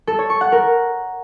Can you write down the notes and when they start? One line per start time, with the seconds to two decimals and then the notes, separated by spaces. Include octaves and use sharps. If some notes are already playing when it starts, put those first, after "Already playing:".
0.07 A4
0.19 C#5
0.30 C#6
0.41 F#5
0.52 A#4